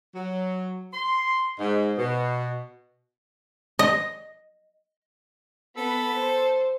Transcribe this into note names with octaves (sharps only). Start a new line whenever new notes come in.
F#3
C6
G#2
B2
D#5
B3 A4 B5
C5